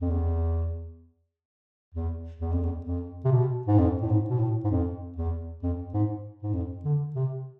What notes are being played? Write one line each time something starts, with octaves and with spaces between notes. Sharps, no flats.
F2
E2
E2
E2
F2
E2
F2
C3
B2
G#2
F2
A2
G#2
B2
A2
G#2
F2
E2
F2
G#2
G#2
F2
D3
C3